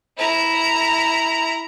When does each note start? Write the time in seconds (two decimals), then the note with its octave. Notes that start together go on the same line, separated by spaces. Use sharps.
0.18 E4 A#5